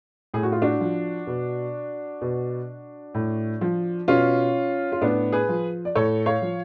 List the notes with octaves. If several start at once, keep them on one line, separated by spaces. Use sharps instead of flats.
A2 G#4
F#4
F4
D4 F#4
F3
B2
B2
A2
F3
B2 C#4 F4
F4
A2 B3 D4
G#4 B4
F3
D5
A2 A4 C#5
C#5 F5
F3